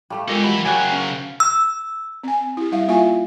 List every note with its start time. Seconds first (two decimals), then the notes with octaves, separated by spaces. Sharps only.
0.10 G3 A3 G4 F5 C#6
0.28 G#3 F4 G4 A4 A#4 D#5
0.44 E3 F#3 G4 B5
0.65 C#3 F#3 F#4 G4 A#4 G5 G#5
0.92 C#4 F5
1.40 E6
2.23 C4 G#5
2.57 E4 G4
2.72 G3 E4 E5 F5
2.88 A#3 F4 E5 F5 G#5 C#6